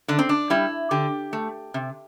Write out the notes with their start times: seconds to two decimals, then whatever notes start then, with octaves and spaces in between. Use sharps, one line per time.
0.08 D3 D4
0.19 C4
0.29 D4
0.50 G3 E4
0.91 D3 G4
1.33 A3
1.74 C3